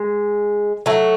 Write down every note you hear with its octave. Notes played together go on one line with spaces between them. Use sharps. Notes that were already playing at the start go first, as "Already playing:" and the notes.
Already playing: G#3
F#3 A3